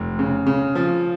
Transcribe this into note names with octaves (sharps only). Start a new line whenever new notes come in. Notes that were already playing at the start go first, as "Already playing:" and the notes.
Already playing: F1
C#3
C#3
F3